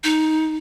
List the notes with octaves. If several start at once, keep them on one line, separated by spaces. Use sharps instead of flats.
D#4